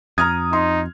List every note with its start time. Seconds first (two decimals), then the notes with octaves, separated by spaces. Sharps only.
0.18 F2 A#5 D#6 F6 G#6
0.53 D#4 C6